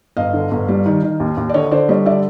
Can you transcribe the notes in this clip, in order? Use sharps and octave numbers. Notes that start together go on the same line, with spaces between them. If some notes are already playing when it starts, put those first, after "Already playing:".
G1 D#5 F5
D3
G1
G3
D#3
D#3
D#2
D#2
D5
D3 C#5 D#5
D3 C5 D5
G3 C#5 D#5
D3 D5 E5